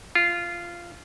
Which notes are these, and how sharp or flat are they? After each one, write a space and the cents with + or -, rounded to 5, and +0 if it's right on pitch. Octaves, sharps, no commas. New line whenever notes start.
F4 -15